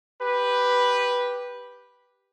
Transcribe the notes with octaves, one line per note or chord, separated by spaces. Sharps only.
G4 B4